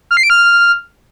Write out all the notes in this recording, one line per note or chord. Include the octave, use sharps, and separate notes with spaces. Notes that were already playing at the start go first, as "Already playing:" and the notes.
F6
C7
D7
F6